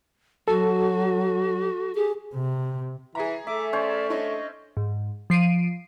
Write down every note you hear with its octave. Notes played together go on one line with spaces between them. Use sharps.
F#3 F#4 A4
G4 G#4
C3
E3 G#4 A#5
A3 E5 D6
C#4 C5 D5
D4 C#5 D#5 C#6
G#2
F3 C7 D7 D#7